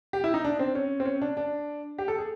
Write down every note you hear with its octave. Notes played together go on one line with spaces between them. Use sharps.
G4
E4
D#4
D4
C4
C#4
C4
C#4
D4
D4
G4
A4
G#4